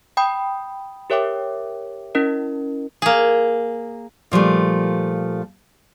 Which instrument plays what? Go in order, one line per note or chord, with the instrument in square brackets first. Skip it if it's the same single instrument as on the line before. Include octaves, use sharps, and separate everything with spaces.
[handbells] G5 B5 D#6 G6
G4 A#4 C#5 E5 G5 D6
C#4 E4 A#4 D#5
[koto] A#3 G#4
[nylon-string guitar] A#2 F3 G3 A3